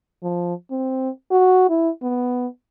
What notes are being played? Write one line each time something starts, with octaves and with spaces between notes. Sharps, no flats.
F3
C4
F#4
E4
B3